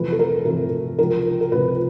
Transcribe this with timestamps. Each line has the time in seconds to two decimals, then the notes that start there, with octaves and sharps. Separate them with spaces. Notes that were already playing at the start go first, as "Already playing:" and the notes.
Already playing: F2 C3 E3 A3 B4
0.12 A4
0.19 A#4
0.45 F2 C3 E3 A3 A#4
0.99 C#2 C3 F3 A#4
1.41 A#4
1.52 C#2 C3 F3 B4